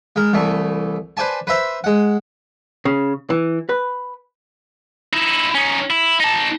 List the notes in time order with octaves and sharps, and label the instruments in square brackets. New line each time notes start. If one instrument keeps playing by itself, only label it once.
[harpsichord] G#3 A#4
C2 E3 A3
B4 C5 D5 G#5 A5
B4 C5 E5 A#5
G#3 F#5
[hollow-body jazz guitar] C#3
E3
B4
[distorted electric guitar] D#4 E4
C#4 D#4
E4
D#4 A5